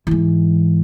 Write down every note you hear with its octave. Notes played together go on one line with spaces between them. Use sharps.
G#2 E3